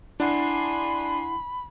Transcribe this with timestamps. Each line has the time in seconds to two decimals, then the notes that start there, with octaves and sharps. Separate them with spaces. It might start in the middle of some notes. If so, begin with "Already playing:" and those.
0.20 D4 E4 G#4 F#5 B5 C6